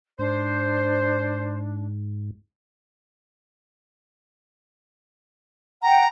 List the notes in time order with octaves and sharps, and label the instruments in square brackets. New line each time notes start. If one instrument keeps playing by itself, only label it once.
[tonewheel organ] G#2 [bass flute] D4 [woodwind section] C5
[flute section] F#5 G5 [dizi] A#5